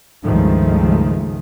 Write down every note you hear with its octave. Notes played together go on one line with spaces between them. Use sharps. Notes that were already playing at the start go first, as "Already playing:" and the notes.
C#2 G2 D#3 F3 G#3 A3